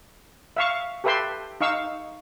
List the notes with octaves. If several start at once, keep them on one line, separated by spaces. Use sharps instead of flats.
E5 F5 C#6
G4 A4 B4 E5 G5 C6
D#4 F5 C#6 E6